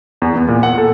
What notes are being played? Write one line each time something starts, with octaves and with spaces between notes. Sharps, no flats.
E2
B3
A#2
F#5
A4